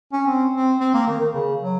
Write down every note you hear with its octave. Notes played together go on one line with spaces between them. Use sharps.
C#4
C4
C4
C4
A#3
D#3
D#3
C#3
F#3